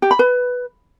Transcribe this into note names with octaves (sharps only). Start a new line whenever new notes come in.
G4
B5
B4